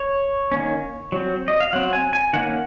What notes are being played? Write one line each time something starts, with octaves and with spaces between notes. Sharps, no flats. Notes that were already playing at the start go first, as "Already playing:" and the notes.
Already playing: C#5
D#3 A#3 C#4
F#3 C4
D#5
F5
F#3 C4 F#5
G#5
G#5
D#3 A#3 C#4 F#5